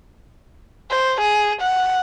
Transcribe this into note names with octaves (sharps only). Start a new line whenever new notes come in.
C5
G#4
F#5